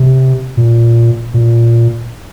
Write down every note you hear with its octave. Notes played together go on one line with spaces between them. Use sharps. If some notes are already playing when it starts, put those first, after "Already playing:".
Already playing: C3
A#2
A#2